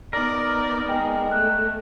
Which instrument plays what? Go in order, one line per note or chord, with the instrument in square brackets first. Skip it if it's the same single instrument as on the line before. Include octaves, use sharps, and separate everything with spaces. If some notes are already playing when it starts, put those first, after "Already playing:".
[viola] B3 D#4 [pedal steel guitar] A#4 [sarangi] D5
[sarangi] G#3 [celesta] G5
[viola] A3 [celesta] F#6